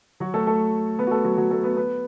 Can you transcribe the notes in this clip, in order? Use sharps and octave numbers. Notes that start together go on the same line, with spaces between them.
F#3 F#4
A3 A4
A3 A4
B3 B4
F#4
A3 A4
F#3 F#4
F#3 F#4
A3 A4
B3 B4
B3 B4